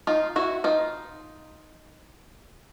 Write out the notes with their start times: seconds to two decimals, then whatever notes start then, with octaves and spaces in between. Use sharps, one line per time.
0.07 D#4 F4
0.36 E4 F#4
0.64 D#4 F4